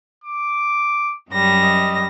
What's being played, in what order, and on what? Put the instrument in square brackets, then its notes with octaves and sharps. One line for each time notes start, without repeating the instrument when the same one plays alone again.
[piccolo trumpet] D6
[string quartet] F#2 G3 A#6
[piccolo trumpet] D#5